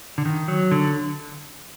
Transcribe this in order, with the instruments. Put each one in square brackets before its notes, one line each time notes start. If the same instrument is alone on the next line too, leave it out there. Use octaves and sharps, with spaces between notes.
[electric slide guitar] D3
D#3
F#3
D3